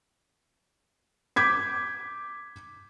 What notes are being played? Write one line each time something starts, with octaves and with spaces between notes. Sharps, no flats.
D6 G6 G#6 B6